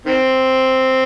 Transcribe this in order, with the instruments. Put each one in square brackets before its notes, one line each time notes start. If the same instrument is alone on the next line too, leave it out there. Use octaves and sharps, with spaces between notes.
[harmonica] D#3 C4